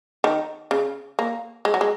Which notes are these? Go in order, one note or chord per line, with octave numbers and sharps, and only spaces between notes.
D#3
C#3
A#3
G#3
F#3
G#3